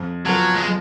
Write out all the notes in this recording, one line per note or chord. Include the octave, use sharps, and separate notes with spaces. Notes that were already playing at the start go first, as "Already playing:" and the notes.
Already playing: F2
F3 F#3 B3
G#3